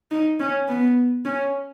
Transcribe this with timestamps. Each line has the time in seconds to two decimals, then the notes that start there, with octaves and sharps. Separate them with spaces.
0.11 D#4
0.40 C#4
0.68 B3
1.25 C#4